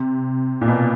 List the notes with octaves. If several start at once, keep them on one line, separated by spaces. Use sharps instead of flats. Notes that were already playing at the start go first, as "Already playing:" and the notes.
Already playing: C3
A#2
B2